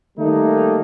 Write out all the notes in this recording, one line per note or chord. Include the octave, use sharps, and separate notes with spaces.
D#3 G3 A3 A#3 D#4